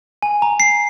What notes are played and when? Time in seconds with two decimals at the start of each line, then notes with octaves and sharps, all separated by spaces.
0.23 G#5
0.42 A#5
0.60 C7